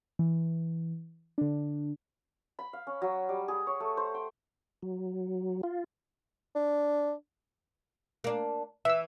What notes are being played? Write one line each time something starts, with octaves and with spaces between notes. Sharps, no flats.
E3
D3 D4
B5
F5
C#4
F#3
G3
G#4
C#5
A3
C5
G5
F#3
F4
D4
A#3 D4
E3 E5 E6